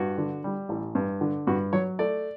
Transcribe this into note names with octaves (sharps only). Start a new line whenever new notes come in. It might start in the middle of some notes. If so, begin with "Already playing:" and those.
Already playing: G2 F#4
D3
G3
A1
G2
D3
G2 F#4
F#3 C#5
A3 D5